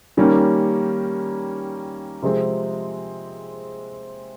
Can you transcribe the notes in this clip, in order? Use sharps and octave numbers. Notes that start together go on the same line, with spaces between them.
D#3 G3 A#3 C#4
C3 F3 G#3 C4